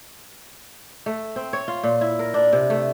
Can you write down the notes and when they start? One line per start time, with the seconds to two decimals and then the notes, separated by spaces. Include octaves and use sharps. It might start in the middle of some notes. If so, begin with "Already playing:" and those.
1.06 A3
1.36 C4
1.53 C#5
1.68 F4
1.83 A#2
2.01 E4
2.19 A#4
2.34 D4
2.53 C3
2.70 A3